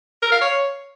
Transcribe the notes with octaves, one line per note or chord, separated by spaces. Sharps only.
A#4
F5
C#5